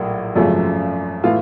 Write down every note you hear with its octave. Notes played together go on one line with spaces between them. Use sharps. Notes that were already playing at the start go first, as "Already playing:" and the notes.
Already playing: A#1 A2 F#3 A#3
G#1 F#2 C#3 F3 A3
A2 E3 F4 F5